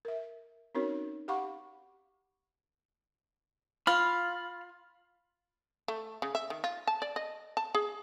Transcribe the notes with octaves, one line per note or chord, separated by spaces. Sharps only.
A#4 E5
C4 C#4 D#4 F#4 A#4 C#5
G4 F5 F#5 B5 C#6 D6
F4 B5 F6
A3
C#3
E5
D#3
F4
A5
D5
D#5
A5
G#4